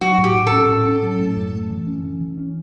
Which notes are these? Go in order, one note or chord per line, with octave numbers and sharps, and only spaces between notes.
F#3 F#4
A2
G4
A2
A4
C#4
A2
C#4
F#3
A2
F#2
A3
E3
C#4
E3
E3
C#4